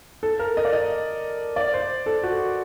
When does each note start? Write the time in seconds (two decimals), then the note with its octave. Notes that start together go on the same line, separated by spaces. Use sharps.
0.23 A4
0.39 A#4
0.57 D#5
0.65 D5
0.73 D#5
1.56 D5
1.74 C5
2.06 A4
2.23 F#4